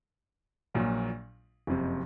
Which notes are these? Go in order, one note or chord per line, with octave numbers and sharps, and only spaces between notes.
A#1 A#2 F#3
F#1 F2 C3